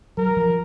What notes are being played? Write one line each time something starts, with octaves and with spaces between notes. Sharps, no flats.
F#3 A#4
F3